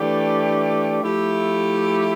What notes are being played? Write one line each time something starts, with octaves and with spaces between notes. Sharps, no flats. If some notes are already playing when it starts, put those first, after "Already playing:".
Already playing: E3 A3 D4 G4
F3 A3 E4 G4